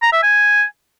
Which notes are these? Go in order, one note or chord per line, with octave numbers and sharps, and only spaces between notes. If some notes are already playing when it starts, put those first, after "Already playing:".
A#5
E5
G#5